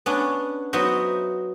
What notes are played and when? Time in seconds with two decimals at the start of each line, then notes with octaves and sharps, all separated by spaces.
0.06 B3 C#4 D4
0.73 F#3 B3 D#4 C5 E5